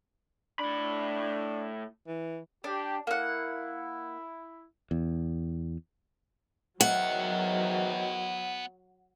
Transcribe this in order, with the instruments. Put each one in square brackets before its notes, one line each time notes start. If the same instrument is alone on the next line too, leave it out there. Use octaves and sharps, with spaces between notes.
[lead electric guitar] A2 B5 [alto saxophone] D4
[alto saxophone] E3
[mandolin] D4 [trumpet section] G4
[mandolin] A#3 F#5 [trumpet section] E4
[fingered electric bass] E2
[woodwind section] G#2 B2 D#3 [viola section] F#3 [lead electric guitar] B3 E5 [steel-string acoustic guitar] F#5